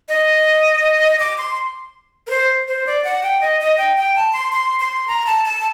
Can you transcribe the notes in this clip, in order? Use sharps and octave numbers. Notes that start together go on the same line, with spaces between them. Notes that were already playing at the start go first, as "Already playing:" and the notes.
D#5
D6
C6
A#4
C5
C5
D5
F#5
G5
D#5
D#5
G5
G5
A5
C6
C6
C6
A#5
A5
A5